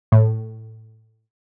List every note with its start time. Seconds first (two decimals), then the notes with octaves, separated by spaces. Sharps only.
0.12 A2